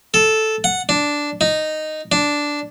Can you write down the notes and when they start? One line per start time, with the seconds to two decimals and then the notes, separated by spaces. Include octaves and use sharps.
0.14 A4
0.64 F#5
0.89 D4
1.41 D#4
2.12 D4